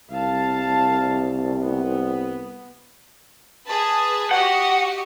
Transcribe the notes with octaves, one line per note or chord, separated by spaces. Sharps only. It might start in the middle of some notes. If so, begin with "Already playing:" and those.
C2 F5 A5
B3
G#4 B4 A5
F#4 G4 D#5 F#5